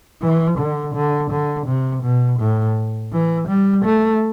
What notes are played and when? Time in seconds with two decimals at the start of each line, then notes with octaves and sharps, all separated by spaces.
0.22 E3
0.59 D3
0.95 D3
1.31 D3
1.67 C3
2.04 B2
2.40 A2
3.12 E3
3.48 G3
3.85 A3